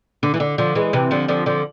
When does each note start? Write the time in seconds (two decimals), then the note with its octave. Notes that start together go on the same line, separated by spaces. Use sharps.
0.23 D3
0.34 E3
0.40 D3
0.58 D3 F3
0.75 E3 G#3
0.93 C3 E3
1.11 D3 F3
1.28 D3 F3
1.46 D3 F3